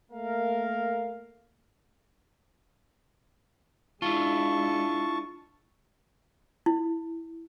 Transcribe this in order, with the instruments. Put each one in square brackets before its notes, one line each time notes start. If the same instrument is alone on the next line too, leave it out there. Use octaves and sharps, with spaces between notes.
[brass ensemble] A3 A#3 A#4 F5
[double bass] G#3 D4 [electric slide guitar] E4 F4 [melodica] A5 C#6
[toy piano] E4